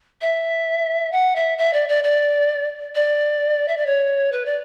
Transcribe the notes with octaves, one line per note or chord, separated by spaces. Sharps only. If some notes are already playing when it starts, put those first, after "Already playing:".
E5
F#5
E5
E5
D5
D5
D5
D5
E5
D5
C#5
B4
D5